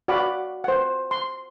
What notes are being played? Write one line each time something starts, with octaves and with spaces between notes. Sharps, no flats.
F#4 D5 F5 F#5 B5 D6
C5 F#5
C6